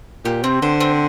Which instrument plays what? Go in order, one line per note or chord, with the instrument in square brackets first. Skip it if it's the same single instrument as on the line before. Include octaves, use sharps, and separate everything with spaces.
[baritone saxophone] A#2 [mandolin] G4
[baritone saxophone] C3 [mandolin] C4
[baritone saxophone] D3 [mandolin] C5
[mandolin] C4